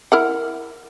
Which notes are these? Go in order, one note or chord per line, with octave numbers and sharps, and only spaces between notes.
E4 A#4 F#5